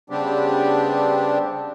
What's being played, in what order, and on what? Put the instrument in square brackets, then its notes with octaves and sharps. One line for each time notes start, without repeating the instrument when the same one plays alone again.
[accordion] C#3 G3 B3 C4 D4 G4